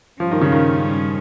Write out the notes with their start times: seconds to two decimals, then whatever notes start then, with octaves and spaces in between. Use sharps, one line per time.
0.20 G2 F3 G3 C#4
0.31 D#3
0.42 C#3
0.52 D#3